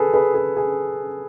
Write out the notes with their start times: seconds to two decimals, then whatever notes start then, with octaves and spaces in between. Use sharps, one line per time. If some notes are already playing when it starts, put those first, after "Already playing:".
Already playing: G#4 A4 B4
0.13 G#4 B4
0.34 G#4
0.57 G#4